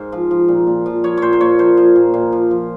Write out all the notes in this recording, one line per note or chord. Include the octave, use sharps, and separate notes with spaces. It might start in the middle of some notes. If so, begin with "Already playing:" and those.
Already playing: G#2 G#4 A#4 C5
F3
F3
A#2
A#2
F3
F3 C#5
A#2 C5 C#5
C5
A#2 C#5
F3 C5
F3 C5
A#2
A#2
F3
F3